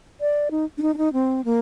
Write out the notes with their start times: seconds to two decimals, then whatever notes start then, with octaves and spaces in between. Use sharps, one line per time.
0.21 D5
0.51 D#4
0.78 D4
0.82 D#4
0.94 D4
0.98 D#4
1.13 C4
1.45 A#3